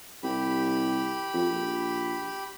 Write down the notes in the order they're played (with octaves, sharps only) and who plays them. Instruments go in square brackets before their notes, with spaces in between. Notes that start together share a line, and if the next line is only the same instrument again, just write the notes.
[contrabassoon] C2 [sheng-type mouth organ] G4 B5
[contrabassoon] F2
A#1